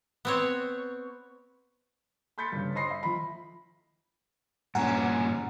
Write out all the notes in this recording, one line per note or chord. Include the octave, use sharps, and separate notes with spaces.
B3 C4 C#5
B5 C6 G6 A6 B6 C#7
G2 C#3
C5 D#5 B5 C6 A#6 C7
E5
F3 B5
G2 A#2 C#4 F#5 G#5 A#5